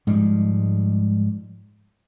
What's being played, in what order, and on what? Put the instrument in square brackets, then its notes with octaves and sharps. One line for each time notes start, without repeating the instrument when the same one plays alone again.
[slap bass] G#2 F3 G3 G#3